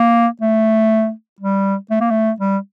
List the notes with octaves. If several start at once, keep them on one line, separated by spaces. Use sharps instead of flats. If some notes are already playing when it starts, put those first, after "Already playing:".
Already playing: A#3
A3
G3
A3
A#3
A3
G3